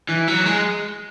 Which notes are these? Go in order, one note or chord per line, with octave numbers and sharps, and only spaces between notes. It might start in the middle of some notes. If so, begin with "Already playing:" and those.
E3
F#3
G#3